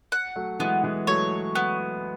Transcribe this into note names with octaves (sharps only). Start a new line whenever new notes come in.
F#5
F#3 A3
E3 G#3 B3
E3 G#3
F#3 A3 C#5
B3